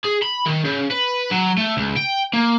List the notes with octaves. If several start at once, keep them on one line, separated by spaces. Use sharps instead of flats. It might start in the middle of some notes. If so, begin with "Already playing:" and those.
G#4
B5
D#3
C#3
B4
F#3
A3
C#2
G5
A#3